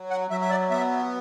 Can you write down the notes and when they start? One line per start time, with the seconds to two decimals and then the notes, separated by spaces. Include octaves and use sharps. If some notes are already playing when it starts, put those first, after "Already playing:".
Already playing: F#3
0.11 F#5
0.31 F#3 E5
0.41 E5
0.50 D5
0.70 B3 E5